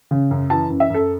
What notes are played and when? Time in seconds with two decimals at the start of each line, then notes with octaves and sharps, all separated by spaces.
0.11 C#3
0.31 F#2
0.50 E3 A5
0.70 F#2
0.80 E5
0.90 F#2 A4